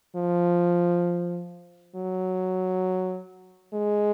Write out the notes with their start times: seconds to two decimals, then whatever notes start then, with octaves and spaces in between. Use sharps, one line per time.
0.16 F3
1.95 F#3
3.74 G#3